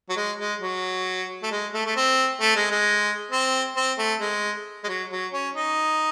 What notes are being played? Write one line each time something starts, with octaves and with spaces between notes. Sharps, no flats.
F#3
G#3
G#3
F#3
A3
G#3
A3
A3
C4
A3
G#3
G#3
C4
C4
A3
G#3
G#3
F#3
F#3
C#4
D#4